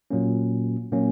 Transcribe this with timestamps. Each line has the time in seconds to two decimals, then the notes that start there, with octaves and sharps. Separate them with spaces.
0.11 A#2 F#3 A#3 C#4
0.91 A#2 F#3 A#3 C#4